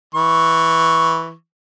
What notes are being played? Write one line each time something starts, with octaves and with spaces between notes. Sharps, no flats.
E3 C#6